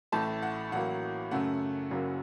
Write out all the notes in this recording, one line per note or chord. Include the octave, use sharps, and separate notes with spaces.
A1 A2 A3 A5
F#5
A1 A2 F#3 A#3 F#5
F#2 C#3 A3 F#5
F#1 F#2 C#3 F#3 A#3